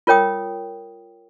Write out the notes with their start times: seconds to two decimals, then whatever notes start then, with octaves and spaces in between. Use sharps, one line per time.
0.07 F4 A#4 C#5 G5 D#6